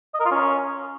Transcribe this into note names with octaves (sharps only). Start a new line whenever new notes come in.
D#5
A#4
F4
C#4